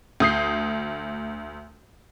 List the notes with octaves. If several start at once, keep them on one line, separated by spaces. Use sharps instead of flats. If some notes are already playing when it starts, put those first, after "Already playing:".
D2 D#6 G6 C7